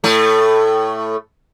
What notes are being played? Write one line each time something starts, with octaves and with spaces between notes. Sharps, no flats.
A2 A3